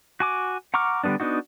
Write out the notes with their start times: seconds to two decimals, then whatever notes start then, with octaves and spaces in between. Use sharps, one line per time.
0.20 F#4 G#5 D6
0.74 F#5 A#5 C#6 D6 F6
1.04 D3 G3 A3 B3 D4
1.20 B3 D4 D#4 F#4